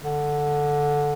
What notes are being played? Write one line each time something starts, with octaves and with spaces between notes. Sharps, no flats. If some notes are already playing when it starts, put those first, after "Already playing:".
D3